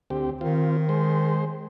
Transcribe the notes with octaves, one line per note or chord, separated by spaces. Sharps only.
D2 C4 G4
D#3 C4 F4
G#3 C5